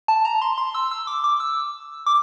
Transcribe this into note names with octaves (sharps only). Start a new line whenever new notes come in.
A5
A#5
C6
C6
E6
E6
D6
D6
E6
D6